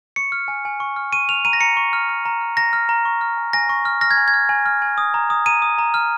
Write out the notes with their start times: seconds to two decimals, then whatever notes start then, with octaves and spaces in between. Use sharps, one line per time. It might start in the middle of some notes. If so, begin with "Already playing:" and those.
0.16 C#6 C#7
0.32 F6
0.48 G#5
0.65 G#5
0.80 C#6
0.96 F6
1.13 C#6 D#7
1.29 F6 F7
1.45 A#5 D#7
1.53 A#6
1.61 A#5 C#7
1.77 C#6
1.93 F6
2.09 F6
2.25 A#5
2.41 F6
2.57 A#5 A#6
2.73 F6
2.89 A#5
3.05 C#6
3.21 F6
3.37 G#5
3.53 G#5 A#6
3.69 C#6
3.85 F6
4.01 F6 A#6
4.11 G#6
4.17 G#5
4.28 G#6
4.34 F6
4.49 G#5
4.66 F6
4.82 G#5
4.98 D#6
5.14 A#5
5.30 D#6
5.46 A#5 D#7
5.62 D#6
5.78 A#5
5.94 F6